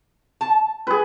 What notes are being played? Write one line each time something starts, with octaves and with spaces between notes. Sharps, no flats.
A5
G#4 B4